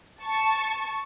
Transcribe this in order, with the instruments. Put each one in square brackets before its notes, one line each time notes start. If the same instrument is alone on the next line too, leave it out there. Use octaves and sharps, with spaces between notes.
[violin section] A5 C#6